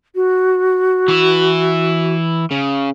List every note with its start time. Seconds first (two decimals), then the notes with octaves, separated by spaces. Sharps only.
0.15 F#4
1.08 E3 E4
2.51 C#3